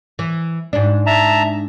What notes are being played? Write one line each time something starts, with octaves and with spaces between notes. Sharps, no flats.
E3
G#2 D4
E5 A5 A#5